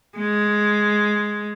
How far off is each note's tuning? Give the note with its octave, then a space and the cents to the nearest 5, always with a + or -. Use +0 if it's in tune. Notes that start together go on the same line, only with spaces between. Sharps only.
G#3 +5